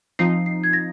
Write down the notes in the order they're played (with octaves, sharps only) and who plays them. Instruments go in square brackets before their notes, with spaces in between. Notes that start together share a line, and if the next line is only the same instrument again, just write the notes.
[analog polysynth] F3 C4 D#4 [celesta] C7
[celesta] C7
G#6
A#6